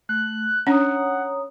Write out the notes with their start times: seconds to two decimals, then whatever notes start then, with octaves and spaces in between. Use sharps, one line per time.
0.09 A3 F#6
0.67 C#4 D4 C#5 F#5 A#5 D#6